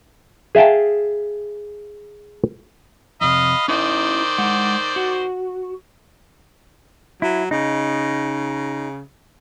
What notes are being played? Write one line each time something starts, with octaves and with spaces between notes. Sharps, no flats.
G#4 E5 F5 G5 A5
F2 C3 D#5 F5 B5
D#3 C#4 E4 C5 D5 D#5
G#3 F#5
F#4
F#3 E4
C#3 D#4